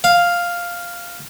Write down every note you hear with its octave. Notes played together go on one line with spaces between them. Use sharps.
F5